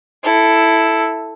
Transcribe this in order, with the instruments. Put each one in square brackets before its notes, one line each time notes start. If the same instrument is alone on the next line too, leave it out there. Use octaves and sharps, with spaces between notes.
[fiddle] E4 A4